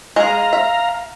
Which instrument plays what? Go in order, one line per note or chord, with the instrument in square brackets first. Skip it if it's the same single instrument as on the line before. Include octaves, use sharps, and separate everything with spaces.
[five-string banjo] G#3 G#4 [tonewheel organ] F5 A#5
[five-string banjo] E5